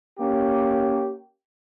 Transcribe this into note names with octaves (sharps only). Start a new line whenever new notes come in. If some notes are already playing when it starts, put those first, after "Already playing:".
A#3 C#4 G4